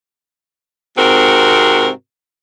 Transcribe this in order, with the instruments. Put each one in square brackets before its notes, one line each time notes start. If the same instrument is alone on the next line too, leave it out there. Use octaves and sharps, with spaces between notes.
[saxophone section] G#2 C3 C4 F#4 A#4